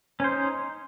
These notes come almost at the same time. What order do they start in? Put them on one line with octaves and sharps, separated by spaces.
C#4 C5 D#4